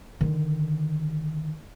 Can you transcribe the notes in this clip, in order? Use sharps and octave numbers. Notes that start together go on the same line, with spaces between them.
D3 D#3